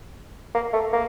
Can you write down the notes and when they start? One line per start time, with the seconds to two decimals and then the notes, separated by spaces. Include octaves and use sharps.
0.55 A#3
0.73 A3
0.93 A#3